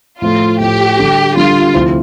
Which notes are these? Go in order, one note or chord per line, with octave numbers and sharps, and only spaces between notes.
A2 F3 A3 F4
A2 F3 A3 G4
D3 G3 D4 A4
D3 G3 D4 F4 A4
D2 C3 F3 C4 E4